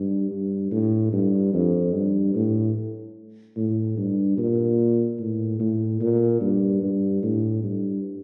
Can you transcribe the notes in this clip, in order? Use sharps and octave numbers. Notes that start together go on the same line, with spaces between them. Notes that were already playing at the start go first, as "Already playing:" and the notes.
Already playing: G2
G2
A2
G2
F2
G2
A2
A2
G2
A#2
A2
A2
A#2
G2
G2
A2
G2